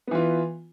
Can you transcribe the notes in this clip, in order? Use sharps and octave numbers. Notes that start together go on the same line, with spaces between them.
E3 B3 F4